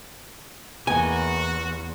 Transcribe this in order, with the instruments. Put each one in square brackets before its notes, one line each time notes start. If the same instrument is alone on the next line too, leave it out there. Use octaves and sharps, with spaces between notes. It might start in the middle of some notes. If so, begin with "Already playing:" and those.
[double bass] E2 [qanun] A#3 B3 D#5 [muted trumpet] F#4 [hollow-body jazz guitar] G#5